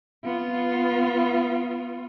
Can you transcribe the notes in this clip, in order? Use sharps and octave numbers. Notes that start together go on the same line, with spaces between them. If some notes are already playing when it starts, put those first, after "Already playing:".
B3 F4